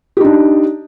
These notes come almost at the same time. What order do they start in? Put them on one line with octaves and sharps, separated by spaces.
G4 D#4 D4